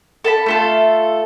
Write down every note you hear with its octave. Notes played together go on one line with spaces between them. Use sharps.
A4 A5 B5
A3 F4 A4